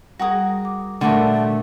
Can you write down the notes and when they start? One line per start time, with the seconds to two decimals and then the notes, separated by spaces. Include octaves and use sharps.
0.19 G3 F#4 G#4 A#4 D#6
0.65 D6
1.01 A#2 D3 A3 F#4 A#4 A5